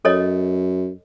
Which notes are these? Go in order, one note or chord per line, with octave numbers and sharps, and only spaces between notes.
F#2 A4 C#5 D#5